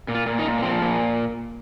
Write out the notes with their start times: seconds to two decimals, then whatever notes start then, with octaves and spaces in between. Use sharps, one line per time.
0.08 A#2
0.15 F4
0.26 A#2
0.39 D#4
0.45 A#2
0.59 A#3
0.63 F3 C4
0.82 A#2